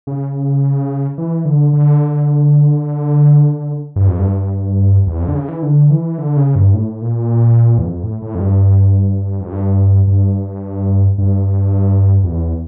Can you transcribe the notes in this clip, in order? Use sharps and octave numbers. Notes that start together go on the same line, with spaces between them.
C#3
E3
D3
D3
G2
F2
G2
E2
F2
D3
C#3
E3
D3
E3
D3
C#3
G2
A2
A#2
E2
F2
A2
A2
F2
G2
F2
G2
G2
G2
F2
E2